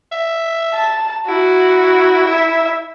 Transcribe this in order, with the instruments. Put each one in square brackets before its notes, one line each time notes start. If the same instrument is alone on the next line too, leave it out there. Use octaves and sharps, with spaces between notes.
[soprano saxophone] E5
[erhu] A5
[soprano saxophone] E4 [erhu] F#4
[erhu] E5